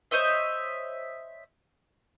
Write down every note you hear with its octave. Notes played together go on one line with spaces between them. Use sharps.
C5 C#5 D#5 E5